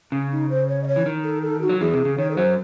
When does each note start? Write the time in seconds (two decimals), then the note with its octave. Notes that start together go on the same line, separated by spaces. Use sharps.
0.12 C#3 C#4
0.32 D#4
0.50 C5
0.69 C#5
0.84 D#5
0.87 C#5
0.96 E3
1.06 D#3
1.24 A4
1.43 A4
1.62 F#4
1.69 F#3
1.80 E2 E3 G#4
1.94 C3
2.05 C#3
2.18 D#3 C#5
2.31 A4
2.36 F#2 F#3 C5